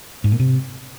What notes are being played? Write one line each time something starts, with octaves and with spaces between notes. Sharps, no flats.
G#2
A#2
C3